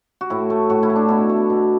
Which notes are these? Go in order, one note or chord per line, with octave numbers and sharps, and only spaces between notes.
F#4
A2 E4
A3
A2 F#4
E4
A3
D4
B2 E4
A3
B2